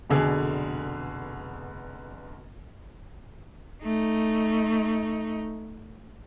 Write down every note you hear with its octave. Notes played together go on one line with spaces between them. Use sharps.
F1 B2 D3 G#4
A3 D#4